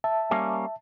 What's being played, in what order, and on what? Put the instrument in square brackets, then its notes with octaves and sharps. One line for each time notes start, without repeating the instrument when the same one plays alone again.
[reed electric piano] E5 A5
[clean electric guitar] G3 A#3 C#4